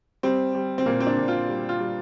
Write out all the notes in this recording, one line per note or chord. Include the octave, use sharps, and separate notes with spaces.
G3 C4
G3
C4
A#2 A#3
C4
D4
A#2
F4
G3
F4
G3